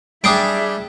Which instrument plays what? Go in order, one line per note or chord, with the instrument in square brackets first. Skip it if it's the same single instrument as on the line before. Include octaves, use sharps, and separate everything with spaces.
[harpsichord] G3 D4 [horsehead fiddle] G#4 E5 [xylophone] D#6 C7 D7